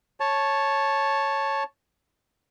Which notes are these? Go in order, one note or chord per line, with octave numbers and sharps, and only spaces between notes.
C#5 A5